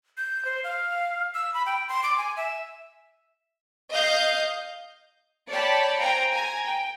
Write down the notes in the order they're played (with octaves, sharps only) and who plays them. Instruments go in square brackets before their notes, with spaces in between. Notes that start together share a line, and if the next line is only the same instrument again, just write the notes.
[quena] G6
C5
F5
E6
B5
G5
C6
D6
G#5
E5
[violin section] D#5 F5 G6
[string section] C#5 D5 G5 A5 B5
C5 F5 G5 G#5 A#5
G#5 A#5
G5